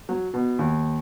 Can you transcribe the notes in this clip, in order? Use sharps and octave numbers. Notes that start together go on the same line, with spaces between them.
F#3
B2
D#2